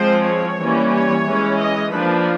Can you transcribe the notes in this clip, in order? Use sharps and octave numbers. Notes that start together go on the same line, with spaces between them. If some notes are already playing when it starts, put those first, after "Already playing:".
Already playing: F3 G#3 C4 C5
C#5
E3 G3 A#3 C#4
C#5
E3 G#3 C#4
D#5
F3 A#3 D4 B4